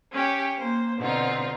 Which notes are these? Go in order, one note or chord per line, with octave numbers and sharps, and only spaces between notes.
C#4 G4 C#5
A#3 C5
B2 D3 C4 D#4 F4